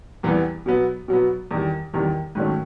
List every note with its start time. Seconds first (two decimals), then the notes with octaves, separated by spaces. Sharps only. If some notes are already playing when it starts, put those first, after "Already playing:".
0.23 E2 C3 E3 G3 B3
0.66 B2 F#3 B3
1.08 B2 F#3 B3
1.51 E2 C3 D#3 G3
1.93 E2 C3 D#3 G3
2.35 G#2 D#3 F#3 A3 C#4